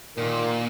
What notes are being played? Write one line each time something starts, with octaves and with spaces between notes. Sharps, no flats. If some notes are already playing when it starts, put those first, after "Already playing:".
A#2 D#3